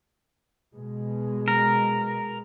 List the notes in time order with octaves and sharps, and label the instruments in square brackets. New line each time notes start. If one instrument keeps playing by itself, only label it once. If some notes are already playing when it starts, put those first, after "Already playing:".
[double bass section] B2 G#3
[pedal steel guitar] A#4